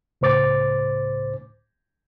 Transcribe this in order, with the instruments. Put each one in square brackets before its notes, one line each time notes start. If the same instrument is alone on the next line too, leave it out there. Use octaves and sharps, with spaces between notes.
[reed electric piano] C#2 A2 C5 D6 A6